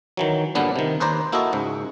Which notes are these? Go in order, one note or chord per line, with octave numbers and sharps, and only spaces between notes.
D#3 E3 F#3
G2 A#2 D3 B3 D4
C3 D#3
D#2 B4 C5 D5 A#5
A#3 E4 F#4 A4 D#5
C#2 G#2